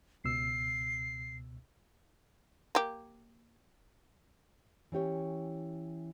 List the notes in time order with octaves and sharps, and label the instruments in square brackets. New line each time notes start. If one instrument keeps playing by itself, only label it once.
[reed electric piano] C#2 B2 E6 [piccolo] C7
[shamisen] A#3 G4
[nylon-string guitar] E3 C#4 G4 C#5